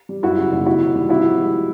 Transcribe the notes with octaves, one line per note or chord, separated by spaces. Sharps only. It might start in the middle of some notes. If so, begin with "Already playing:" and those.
G3
F#2 E4 F#4
C#3
F#1
C3 E4 F#4
D#3
G3
C3 E4 F#4
F3
G#3